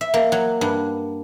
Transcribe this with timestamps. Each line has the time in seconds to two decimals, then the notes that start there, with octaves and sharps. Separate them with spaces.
0.01 E5
0.14 A#3
0.32 F#3
0.61 G2